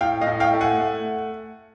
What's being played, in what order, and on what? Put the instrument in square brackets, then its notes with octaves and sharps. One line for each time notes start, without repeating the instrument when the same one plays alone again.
[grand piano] A2 F5 G5
D#5 F5
A2
F5 G5
A3
F#5 G#5
A3